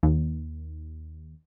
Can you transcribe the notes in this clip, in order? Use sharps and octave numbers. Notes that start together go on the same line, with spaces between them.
D#2